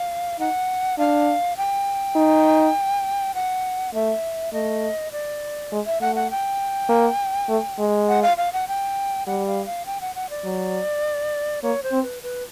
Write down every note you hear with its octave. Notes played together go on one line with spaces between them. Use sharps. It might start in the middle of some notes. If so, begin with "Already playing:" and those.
Already playing: F5
D#4 F#5
D4 F5
G5
D#4
F#5
A3 E5
A3 D#5
D5
G#3
E5
A3 F#5
F#5
G5
A#3
A3
G#3
F#5
F5
F5
F#5
G5
G3 F#5
F5
F5
G5
F#5
F#5
D5
F#3
A#3 C#5
C5
C4
B4
B4